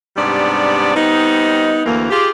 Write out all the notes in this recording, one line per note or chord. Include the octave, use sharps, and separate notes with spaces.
G#2 C3 G3 B3 D4 D5
G3 B3 C4 D#4
D2 E3 A#3
F4 G4 G#4